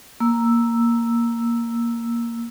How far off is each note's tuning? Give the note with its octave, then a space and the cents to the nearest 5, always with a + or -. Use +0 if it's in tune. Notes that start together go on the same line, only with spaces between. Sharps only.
A#3 +0 E6 +0